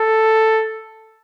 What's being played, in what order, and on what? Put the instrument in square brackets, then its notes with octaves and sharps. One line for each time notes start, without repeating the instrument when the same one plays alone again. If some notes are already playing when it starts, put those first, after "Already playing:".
Already playing: [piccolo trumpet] A4